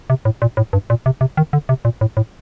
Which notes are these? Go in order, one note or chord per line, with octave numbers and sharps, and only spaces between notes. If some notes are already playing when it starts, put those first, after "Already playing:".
C3
A2
A#2
A2
G2
A#2
C3
C3
D#3
D3
C3
A#2
A2
A2